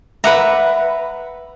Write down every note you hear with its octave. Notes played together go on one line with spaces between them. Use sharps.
B4 E5 F#5 A#5 D6